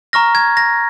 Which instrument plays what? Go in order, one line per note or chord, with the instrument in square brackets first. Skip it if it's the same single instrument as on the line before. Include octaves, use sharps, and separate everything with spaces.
[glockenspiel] A#5 C#6 F6 A#6
G#6
A#6